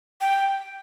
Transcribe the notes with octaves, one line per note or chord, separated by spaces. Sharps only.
G5